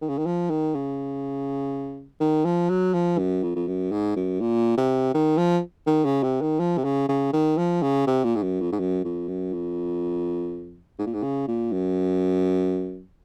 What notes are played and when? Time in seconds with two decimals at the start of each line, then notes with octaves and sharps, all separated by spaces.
0.02 D#3
0.09 C#3
0.18 D#3
0.26 F3
0.50 D#3
0.75 C#3
2.20 D#3
2.45 F3
2.70 F#3
2.94 F3
3.18 F#2
3.43 F2
3.55 F2
3.67 F#2
3.92 G#2
4.16 F#2
4.41 A#2
4.77 C3
5.14 D#3
5.38 F3
5.86 D#3
6.05 C#3
6.23 C3
6.41 D#3
6.59 F3
6.78 C3
6.84 C#3
7.08 C#3
7.33 D#3
7.58 F3
7.82 C#3
8.07 C3
8.24 A#2
8.36 G#2
8.43 F#2
8.61 F2
8.72 G#2
8.80 F#2
9.04 F2
9.28 F#2
9.53 F2
10.99 G#2
11.06 A#2
11.14 G#2
11.23 C#3
11.48 A#2
11.72 F#2